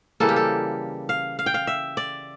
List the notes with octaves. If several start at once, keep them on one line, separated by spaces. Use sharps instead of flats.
C#3 E3 G3 A#3 A4
G4
A4
F5
F5
G5
F5
E5
D5